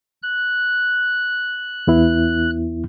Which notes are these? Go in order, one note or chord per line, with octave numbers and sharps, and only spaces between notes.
F#6
E2 B3 E4